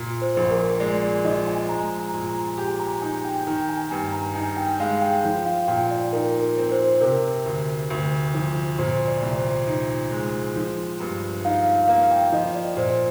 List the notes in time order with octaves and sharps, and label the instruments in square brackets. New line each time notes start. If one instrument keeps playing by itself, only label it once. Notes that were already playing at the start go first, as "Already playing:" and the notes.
Already playing: [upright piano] A#2
[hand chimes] C5
[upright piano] A#1
[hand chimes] A#4
[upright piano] G#3 [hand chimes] D5
[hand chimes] D5
[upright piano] F3 [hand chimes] D#5
[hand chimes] G#5
[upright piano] G#3 [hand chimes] A#5
[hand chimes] A#5
[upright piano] A#2
[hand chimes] A#5
[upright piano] G4 [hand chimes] G#5
[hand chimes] A#5
[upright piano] D#4 [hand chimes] G#5
[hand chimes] G5
[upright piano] D#3 [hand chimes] G5
[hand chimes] G#5
[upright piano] G2 [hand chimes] G#5
[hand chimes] A#5
[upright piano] D#4 [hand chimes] G#5
[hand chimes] G5
[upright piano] G#3 [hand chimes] F5
[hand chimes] G5
[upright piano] F3 [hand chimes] G5
[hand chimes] F5
[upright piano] A#2 [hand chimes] G5
[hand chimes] D5
[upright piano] D#4 [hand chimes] A#4
[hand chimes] A#4
[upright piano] C4
[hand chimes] C5
[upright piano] C3 [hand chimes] A#4
[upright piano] D2
D2
F3
[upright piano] A#2 [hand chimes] C5
[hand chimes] D5
[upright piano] C2
[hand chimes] C5
[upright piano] D#4
G#3
F3
G2
[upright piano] D#4 [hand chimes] F5
[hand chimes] F5
[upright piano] A#3 [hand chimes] F5
[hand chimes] G5
[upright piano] F3 [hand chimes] D#5
[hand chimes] D5
[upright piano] A#2 [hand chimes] C5